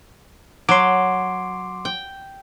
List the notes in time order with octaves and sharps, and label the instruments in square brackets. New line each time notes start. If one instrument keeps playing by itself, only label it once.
[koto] F#3 [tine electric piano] C6 D6
[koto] G5